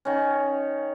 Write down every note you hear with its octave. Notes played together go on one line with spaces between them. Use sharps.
D#3 C#4